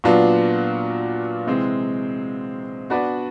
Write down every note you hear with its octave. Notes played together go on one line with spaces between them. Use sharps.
A#2 F#3 B3 D4 F4
C3 E3 G#3 C4
B3 D4 F#4 B4 D5